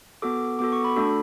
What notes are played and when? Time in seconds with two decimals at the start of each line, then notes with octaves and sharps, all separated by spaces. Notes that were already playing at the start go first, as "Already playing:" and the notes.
0.22 B3 F#4 A4 D6
0.59 B3 F#4 A4 D6
0.72 C#6
0.84 B5
0.96 A3 D4 F#4 A4